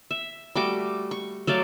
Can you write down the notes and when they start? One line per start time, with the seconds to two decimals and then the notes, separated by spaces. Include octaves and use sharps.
0.11 E5
0.55 G3 A3 F#4 D6
1.11 C#6
1.47 F#3 A3 D5 F5